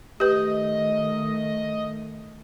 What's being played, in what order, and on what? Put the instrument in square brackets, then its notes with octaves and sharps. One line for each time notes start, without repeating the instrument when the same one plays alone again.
[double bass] D#3 A3 [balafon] G4 B4 [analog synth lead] D#5